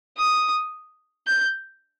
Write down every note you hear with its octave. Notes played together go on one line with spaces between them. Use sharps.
D#6
G6